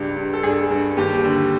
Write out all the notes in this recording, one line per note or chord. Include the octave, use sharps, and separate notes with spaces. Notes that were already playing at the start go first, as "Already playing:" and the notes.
Already playing: C#2 G2 G4
G2
A4
G2 G#4
G2
D#2 G4
D3